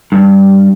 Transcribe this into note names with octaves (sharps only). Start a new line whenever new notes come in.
G2